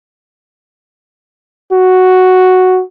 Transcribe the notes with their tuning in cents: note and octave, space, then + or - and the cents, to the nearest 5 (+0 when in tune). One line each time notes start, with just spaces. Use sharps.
F#4 +0